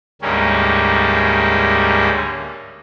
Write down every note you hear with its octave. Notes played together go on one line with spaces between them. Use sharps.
D2 G#2 G3 A#3 C#4